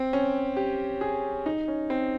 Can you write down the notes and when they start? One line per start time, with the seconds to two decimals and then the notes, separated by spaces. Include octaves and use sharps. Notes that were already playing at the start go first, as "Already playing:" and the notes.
Already playing: C4
0.13 C#4
0.56 G4
1.01 G#4
1.46 D#4
1.68 C#4
1.90 C4